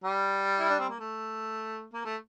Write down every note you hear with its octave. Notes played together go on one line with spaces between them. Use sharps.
G3
E4
D4
C4
A#3
A3
A#3
A3